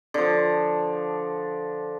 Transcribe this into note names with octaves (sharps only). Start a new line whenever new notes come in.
D3 F3